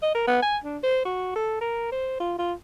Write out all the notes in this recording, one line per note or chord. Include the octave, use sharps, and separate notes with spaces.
D#5
A#4
B3
G#5
D4
C5
F#4
A4
A#4
C5
F4
F4